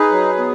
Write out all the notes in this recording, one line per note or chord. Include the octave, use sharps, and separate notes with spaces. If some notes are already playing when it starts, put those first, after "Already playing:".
Already playing: D#4 G#4 B4
F#3
B3